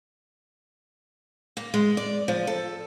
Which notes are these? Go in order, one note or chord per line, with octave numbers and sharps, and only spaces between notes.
A#3
G#3
D5
F3
A4